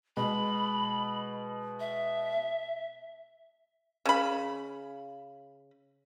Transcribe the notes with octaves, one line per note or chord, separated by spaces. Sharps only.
B2 G#3 B5
E5
C#3 B5